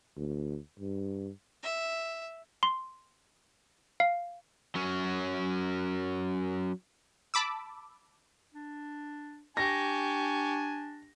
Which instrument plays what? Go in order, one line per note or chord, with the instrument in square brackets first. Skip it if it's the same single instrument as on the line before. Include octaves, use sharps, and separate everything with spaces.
[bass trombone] D2
G2
[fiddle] E5
[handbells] C6
F5
[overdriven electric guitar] F#3 C#4
[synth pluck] A5 B5 D6 E6
[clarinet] D4
[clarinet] D4 [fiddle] G4 C#6 [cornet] G#5 [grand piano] A#6